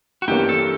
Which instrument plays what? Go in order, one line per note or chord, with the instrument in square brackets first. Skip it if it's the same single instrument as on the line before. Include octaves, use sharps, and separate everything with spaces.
[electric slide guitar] F#4
[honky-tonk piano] G2 E3 G3 A#3 C#4 [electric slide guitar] G4
[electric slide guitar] A4